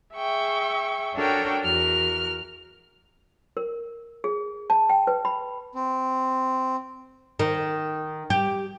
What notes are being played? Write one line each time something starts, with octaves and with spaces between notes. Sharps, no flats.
G#4 E5 G5 C#6
D4 F#4 A4 A#4 C#5 G5
E2 F#4 A#4 F6
A#4
G#4
A5
G5
B4
B5
C4
D#3
G4